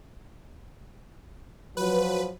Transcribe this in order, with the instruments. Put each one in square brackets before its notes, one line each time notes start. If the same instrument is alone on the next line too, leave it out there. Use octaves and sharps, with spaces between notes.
[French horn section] F3 F#3 [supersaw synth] B4